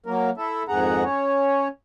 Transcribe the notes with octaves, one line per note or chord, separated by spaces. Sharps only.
F#3 A#3 A#4
E4 A4 E5
F2 G#2 D#3 G#4 F#5 A#5
C#4 C#5